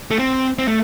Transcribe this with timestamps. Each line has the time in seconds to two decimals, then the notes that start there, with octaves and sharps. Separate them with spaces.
0.11 A3
0.19 C4
0.59 C4
0.68 A3